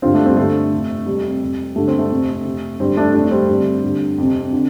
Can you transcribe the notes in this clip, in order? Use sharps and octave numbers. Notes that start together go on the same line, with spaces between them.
G2 D3 C4 F4
A3 D4
G3 C4
G2 D3 A3
F2 C3
F2 C3 G3
F2 C3
G2 D3 A3
C4
A3
F2 C3
F2 C3
G2 D3 G3 C4
A3 D4
F2 C3 A3 D4
D4
G3 C4
G2 D3 G3 C4
G2 D3
F2 C3
D3